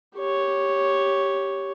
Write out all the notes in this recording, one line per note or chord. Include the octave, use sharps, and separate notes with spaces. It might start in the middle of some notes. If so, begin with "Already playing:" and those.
G4 C#5